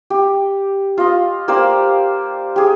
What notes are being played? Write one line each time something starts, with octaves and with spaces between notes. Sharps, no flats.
G4
F4 D#5
A#3 G4 C5 D5
G4 G#4